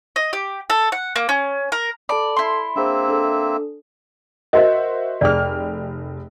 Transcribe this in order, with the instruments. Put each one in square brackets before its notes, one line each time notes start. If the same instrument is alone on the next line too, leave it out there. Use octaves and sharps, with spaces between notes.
[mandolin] D#5
G4
A4
F#5
A#3
C#4
A#4
[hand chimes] A4 A5 B5 [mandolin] D5
[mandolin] E4 C6
[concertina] A#3 C4 E5 [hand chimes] D4 G#4 C5
[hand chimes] D4 A4
[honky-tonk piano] F#4 C5 E5 [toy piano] A#4 D#5
[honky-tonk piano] F1 G5 F6 [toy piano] G#4 D5